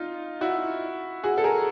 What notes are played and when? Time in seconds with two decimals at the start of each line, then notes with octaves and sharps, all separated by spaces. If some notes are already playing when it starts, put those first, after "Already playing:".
Already playing: D#4 F4
0.41 E4 F#4
1.23 F#4 G#4
1.38 A4
1.44 G#4 A#4